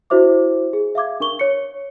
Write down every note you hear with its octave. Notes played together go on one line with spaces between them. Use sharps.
D4 E4 F#4 C5 E5 D6
G#4
E5 F5 D6 G#6
D4 A#4 C#6 G7
C#5 C#7